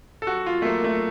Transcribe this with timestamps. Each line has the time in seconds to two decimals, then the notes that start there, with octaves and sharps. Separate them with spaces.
0.22 A4
0.27 F#4
0.46 F4
0.62 A3
0.65 A#3
0.84 A3